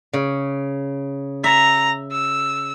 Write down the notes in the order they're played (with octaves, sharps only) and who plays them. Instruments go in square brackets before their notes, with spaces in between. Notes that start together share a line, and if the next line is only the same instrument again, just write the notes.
[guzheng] C#3
[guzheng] E5 [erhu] A#5
[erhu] E6